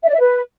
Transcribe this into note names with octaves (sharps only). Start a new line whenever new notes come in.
E5
D5
E5
B4